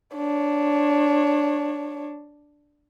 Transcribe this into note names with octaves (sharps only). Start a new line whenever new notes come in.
D4 C#5